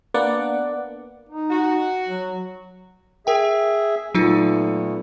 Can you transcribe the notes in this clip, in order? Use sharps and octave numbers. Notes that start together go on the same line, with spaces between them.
A#3 B3 D4 D5 F#5
D#4
F#4
F#3
G#4 A#4 E5 G5
A#2 F#3 A3 B3 D#4 F4